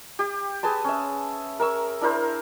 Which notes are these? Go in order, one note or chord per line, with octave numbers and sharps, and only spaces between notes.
G4
G#4 B4 A5 C6
C#4 E5
A#4 C#6 E6
D4 E4 A#4 C5